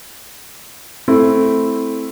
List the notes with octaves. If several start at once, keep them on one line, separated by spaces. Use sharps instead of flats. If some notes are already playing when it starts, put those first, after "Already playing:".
A3 C4 E4